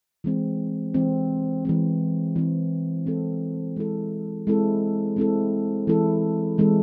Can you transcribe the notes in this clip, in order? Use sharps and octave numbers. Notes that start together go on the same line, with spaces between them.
E3 G#3 C4
E3 G#3 C4
E3 G#3 C4
E3 G#3 C4
G#3 C4 E4 A4
G#3 C4 E4 A4
G#3 C4 E4 A4
G#3 C4 E4 A4
E3 G#3 C4 E4 A4
E3 G#3 C4 E4 A4